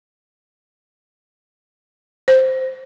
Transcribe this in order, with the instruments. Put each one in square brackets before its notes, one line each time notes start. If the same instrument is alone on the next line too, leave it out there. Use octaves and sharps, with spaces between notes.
[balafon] C5